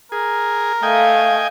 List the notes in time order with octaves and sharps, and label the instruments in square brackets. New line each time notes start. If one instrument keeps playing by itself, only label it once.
[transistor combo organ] G#4 [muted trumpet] A#4
[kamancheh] A3 F5 [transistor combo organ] D#5 G5 G#5